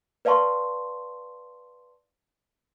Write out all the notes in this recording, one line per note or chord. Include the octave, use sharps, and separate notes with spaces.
B4 D5 F5 A5 C6 C#6